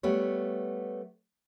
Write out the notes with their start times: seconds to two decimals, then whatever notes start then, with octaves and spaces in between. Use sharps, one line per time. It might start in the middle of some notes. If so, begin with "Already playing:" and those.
0.03 G3 A3 B3 C#5